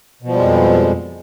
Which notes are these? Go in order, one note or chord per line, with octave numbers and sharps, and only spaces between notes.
F2 B2 F3 G3 G#3